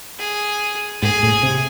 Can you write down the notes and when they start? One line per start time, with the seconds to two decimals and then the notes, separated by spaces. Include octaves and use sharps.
0.19 G#4
1.02 G#2 G#4
1.23 A2
1.43 C3